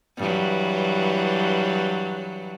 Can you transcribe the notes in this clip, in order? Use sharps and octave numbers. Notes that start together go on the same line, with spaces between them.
G2 E3 F#3